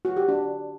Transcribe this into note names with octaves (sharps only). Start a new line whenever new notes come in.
F#4
G4
D4